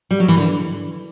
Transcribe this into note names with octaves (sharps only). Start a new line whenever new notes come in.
G3
F#3
E3
D3